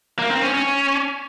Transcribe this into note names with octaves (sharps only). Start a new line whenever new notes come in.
A#3
C4
C#4
C#4